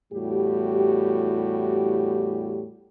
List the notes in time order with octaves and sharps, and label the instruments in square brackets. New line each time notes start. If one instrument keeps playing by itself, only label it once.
[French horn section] E2 A2 G3 F#4 G4